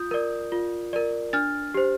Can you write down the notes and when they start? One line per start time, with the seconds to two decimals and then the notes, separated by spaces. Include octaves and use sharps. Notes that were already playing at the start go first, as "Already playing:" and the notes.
Already playing: F4 D#6 G6
0.11 A#4 D5
0.52 F4
0.93 A#4 D5
1.33 D4 F6 A6
1.74 G4 C5